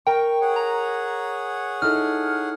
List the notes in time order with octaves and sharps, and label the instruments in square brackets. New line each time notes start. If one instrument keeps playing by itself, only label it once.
[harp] A#4 [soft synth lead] G5 [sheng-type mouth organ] C#6
[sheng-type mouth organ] G#4 C#5 F#5
[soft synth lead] A#5
[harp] D#4 E4 A4 [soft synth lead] F6